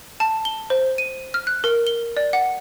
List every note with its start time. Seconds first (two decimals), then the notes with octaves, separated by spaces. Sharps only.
0.20 A5
0.45 G7
0.70 C5
0.98 D#7
1.34 F6
1.47 F#6
1.64 A#4
1.87 G7
2.17 D5
2.33 F#5